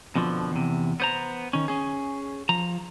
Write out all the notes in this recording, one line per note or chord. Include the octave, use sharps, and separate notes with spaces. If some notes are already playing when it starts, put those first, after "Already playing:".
F2 B2 D3 F3
E2 C3
B3 C5 A#5
D#3 C#4
C#4 G#4
F3 A#5